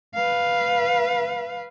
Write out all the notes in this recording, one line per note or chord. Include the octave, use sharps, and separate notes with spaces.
B4 F5